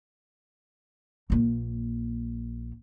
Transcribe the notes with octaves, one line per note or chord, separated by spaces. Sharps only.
A#1 A#3